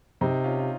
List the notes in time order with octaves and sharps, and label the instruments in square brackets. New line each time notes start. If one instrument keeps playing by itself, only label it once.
[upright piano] C3 [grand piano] C4 D#4
[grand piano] C#4 F4
F4